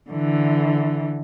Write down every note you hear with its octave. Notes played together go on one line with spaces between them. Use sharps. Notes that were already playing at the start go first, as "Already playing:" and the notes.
D3 E3